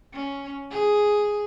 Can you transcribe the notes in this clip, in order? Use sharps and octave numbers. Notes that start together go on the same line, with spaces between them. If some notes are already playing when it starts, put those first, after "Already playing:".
C#4
G#4